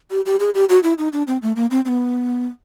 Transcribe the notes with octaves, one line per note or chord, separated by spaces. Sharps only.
G4
G4
G#4
G4
F#4
E4
D#4
D4
C4
A3
A#3
C4
C4
B3